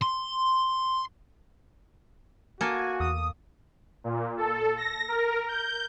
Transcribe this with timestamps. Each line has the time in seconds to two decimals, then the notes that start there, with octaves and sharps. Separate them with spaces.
0.02 C6
2.61 A#3 F#4 A4 G#5
3.00 E2 D#6
4.04 A#2
4.37 A4
4.77 A#6
5.08 A#4
5.49 G6